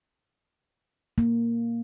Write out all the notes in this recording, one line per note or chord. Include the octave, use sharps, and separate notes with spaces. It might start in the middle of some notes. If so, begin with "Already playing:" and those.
A#3